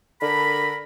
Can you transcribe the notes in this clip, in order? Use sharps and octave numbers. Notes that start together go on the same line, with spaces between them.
D3 A#4 B5